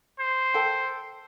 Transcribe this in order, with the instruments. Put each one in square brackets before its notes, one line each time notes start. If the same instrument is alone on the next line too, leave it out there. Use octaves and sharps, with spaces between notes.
[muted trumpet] C5
[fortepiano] A4 G5